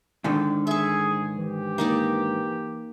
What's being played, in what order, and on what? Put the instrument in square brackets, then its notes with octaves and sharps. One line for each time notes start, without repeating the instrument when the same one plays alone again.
[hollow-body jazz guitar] G#2 D3 D#3
[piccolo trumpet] G#4 [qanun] E5 C#6
[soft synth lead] E3 [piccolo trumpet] G4
[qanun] A#3 D#4 D5